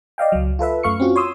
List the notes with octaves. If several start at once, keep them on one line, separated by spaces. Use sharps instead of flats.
D5 D#5 F5 G5
C#2 F#3
F4 A4 B4 E5
F#2 A3 F5 C#6 C#7
C4 C#4 F4 F#4
C#5 C6 D#6 E6